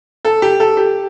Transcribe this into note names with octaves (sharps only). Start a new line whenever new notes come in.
A4
G4
A4
G4